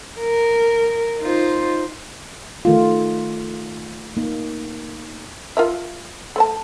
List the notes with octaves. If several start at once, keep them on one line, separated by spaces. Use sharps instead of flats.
A#4
D#4 F4 C5
D#3 A3 F4
A#3 D#4
F4 A#4 E5
A3 C5 A5